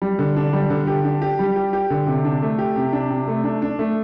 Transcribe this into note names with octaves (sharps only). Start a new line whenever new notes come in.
G3
D3
D4
G3
D3
G4
D4
G4
G3
G4
G4
D3
C3
D4
A3
G4
C3
D4
C3
A3
D4
D4
A3